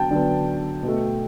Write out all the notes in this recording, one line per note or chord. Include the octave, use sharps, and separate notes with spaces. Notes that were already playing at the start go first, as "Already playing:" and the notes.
Already playing: D3 F#3 B3 G5 A5
D3 F#3 B3
B2 A3